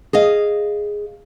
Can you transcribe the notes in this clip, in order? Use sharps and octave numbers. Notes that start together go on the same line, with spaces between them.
G#4 D#5 F5